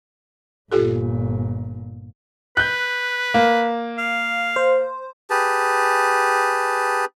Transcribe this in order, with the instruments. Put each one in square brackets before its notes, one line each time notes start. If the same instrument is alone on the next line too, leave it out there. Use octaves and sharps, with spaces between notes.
[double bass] G1 A#2 [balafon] F4 G4 A4
[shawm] B4 [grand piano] F#6 G6
[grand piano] A#3
[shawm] F5
[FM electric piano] C5
[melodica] G4 G#4 B4 A5